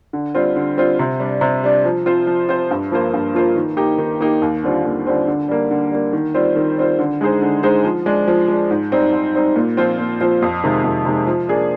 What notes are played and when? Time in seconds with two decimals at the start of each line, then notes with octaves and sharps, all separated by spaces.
0.13 D3
0.34 G3 C4 F4
0.56 D3
0.77 G3 C4 F4
0.99 C3
1.20 G3 D4
1.41 C3
1.64 G3 D4
1.85 F3
2.06 C4 F4 C5
2.27 F3
2.49 C4 F4 C5
2.71 G2
2.92 F3 A#3 F4 C5
3.14 G2
3.34 F3 A#3 F4 C5
3.56 D#3
3.77 A#3 D#4 G4
3.98 D#3
4.21 A#3 D#4 G4
4.42 D#2
4.64 D3 G3 C4 F4
4.85 D#2
5.06 D3 G3 C4 F4
5.28 D3
5.49 G3 A#3
5.71 D3
5.91 G3 A#3
6.13 D#3
6.34 G3 C4 F4 C5
6.56 D#3
6.77 G3 C4 F4 C5
6.99 D3
7.21 G#3 D#4 G#4 C5
7.42 D3
7.63 G#3 D#4 G#4 C5
7.84 F3
8.06 G#3 D4
8.28 F3
8.48 G#3 D4
8.71 G#2
8.92 G3 C4 D#4
9.13 G#2
9.34 G3 C4 D#4
9.56 A#2
9.77 F3 C4 F4 C5
9.99 A#2
10.21 F3 C4 F4 C5
10.42 F2
10.64 C3 D#3 G#3
10.84 F2
11.05 C3 D#3 G#3
11.27 F3
11.49 A#3 D4 G#4